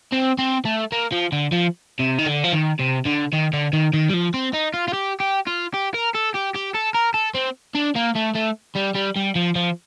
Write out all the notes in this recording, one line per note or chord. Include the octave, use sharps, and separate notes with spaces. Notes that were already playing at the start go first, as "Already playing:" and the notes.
C4
C4
A3
A#3
F3
D3
F3
C3
D#3
D3
F3
D#3
C3
D3
D#3
D3
D#3
D#3
G3
F3
C4
D#4
F4
F4
G4
G4
F4
G4
A#4
A4
G4
G4
A4
A#4
A4
C4
D4
A#3
A3
A3
G3
G3
G3
F3
F3